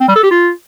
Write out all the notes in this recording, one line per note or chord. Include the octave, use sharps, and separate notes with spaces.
C4
G3
A4
G4
F4